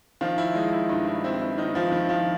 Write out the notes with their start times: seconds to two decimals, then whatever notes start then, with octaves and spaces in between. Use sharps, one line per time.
0.21 D#3 F3 F4
0.38 E4
0.55 G#3 D#4
0.72 E4
0.89 G2 D#4
1.07 E4
1.24 C4 E4
1.41 E4
1.58 D#3 D#4
1.75 F3 F4
1.92 D#3 E4
2.09 F3 F4